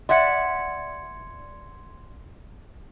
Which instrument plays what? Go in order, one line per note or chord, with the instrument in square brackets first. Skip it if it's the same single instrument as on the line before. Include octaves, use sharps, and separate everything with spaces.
[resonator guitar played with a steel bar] D5 E5 F#5 [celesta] C6 G#6 C#7